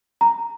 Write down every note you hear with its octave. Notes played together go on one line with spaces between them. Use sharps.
A#5